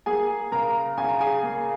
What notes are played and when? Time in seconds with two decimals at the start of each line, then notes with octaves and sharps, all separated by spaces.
0.06 A#3 G#4 G#5
0.52 C#3 A#4 A#5
0.97 C#3 G#5
1.09 A#5
1.21 G#4 G#5
1.43 A#3